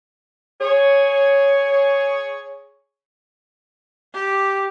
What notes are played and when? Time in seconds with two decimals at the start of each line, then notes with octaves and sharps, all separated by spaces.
0.60 G#4 C#5
4.14 G4